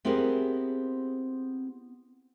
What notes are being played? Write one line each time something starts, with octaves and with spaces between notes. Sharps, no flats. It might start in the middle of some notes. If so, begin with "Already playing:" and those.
B3 C4 E4 G4 G#4 A#4